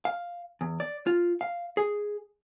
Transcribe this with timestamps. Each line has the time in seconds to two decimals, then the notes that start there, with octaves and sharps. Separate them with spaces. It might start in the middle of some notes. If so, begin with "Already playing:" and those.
0.05 F5
0.61 E2
0.80 D5
1.07 F4
1.41 F5
1.77 G#4